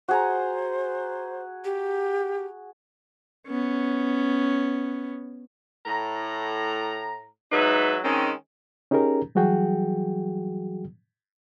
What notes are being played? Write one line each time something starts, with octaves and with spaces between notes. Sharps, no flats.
F#4 G#4 C5 A#5
G4
B3 C#4
A2 A#5
G#2 F#3 D#4 B4 E5
D#3 G#3 C4 C#4
C#4 D#4 G4 G#4 A#4 A#5
E3 F#3 G3 F#4 G#4 G5